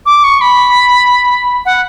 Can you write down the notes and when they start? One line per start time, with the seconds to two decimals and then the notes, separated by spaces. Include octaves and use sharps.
0.06 D6
0.24 C#6
0.41 B5
1.66 F#5